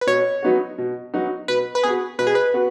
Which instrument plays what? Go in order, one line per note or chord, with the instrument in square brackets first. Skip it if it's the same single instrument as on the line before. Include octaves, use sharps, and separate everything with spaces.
[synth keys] B4
[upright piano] B2 [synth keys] C#5
[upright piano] F#3 B3 D#4 F#4
B2
F#3 B3 D#4 F#4
[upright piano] B2 [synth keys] B4
[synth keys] B4
[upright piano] B3 F#4 [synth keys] G#4
[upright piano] B2 [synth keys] B4
[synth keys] G#4
B4
[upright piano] B3 F#4